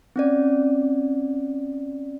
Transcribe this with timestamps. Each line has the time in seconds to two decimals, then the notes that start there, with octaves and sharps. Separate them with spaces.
0.16 C4 C#4 D5